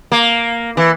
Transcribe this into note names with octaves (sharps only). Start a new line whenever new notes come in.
A#3
E3